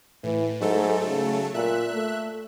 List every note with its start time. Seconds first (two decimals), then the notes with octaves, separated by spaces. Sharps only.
0.24 A2 E3
0.61 G#2 F#3 A3 A4
1.07 C#3
1.54 A#2 E5 F#6
1.93 A3